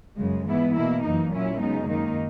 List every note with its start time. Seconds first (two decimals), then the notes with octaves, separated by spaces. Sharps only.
0.17 F#2 C#3 G#3
0.46 G#2 E3 B3 E4
0.74 B2 A#3 E4
1.03 F#2 E3 A#3 D#4
1.32 A#2 F#3 C#4 E4
1.60 F#2 C#3 G#3 B3 D#4
1.89 F#2 D#3 A#3 D#4